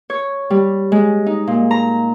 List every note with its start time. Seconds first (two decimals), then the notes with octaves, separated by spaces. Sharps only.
0.10 C#5
0.50 G3
0.92 G#3
1.26 D#4
1.47 A#2
1.71 A#5